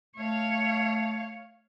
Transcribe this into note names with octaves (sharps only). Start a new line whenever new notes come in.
A3 C#5 F5